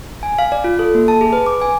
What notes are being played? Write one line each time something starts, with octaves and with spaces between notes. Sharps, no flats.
G#5
F5
D5
F4
A4
A#3
A5
G#4
B4
D6
G#5